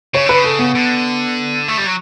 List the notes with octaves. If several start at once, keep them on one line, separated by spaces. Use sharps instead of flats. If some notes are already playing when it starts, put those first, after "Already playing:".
C#3 C#5
D3 B4
C#3
A4
B3
D3
A3
G3
F#3